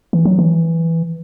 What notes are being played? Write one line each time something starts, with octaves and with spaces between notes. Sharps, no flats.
E3
F#3
E3